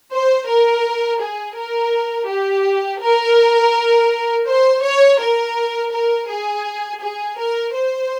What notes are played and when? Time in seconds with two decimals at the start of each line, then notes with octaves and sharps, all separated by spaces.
0.12 C5
0.49 A#4
1.21 G#4
1.57 A#4
2.29 G4
3.02 A#4
4.47 C5
4.83 C#5
5.20 A#4
5.92 A#4
6.29 G#4
7.01 G#4
7.38 A#4
7.74 C5